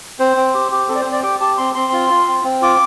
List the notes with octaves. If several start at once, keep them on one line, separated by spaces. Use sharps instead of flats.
C4 C5
C4
G4
G4
C4 A4
D5
C5
C4
D5
G4 G5
G4 A5
C4 C6
C4 C6
F4
F4
C4
C4
F4 D6